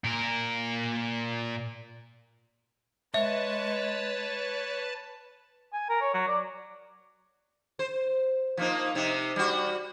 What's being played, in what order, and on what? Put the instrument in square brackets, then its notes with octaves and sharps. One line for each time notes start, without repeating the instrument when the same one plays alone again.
[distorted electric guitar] A#2 A#4
[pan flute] G#3 [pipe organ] B4 A5 [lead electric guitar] C#5 [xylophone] E5
[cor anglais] G#5
A#4
C#5
F#3
D5
[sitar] C5
F3 A#3 D#4
C3 C4 D#4
G3 F#4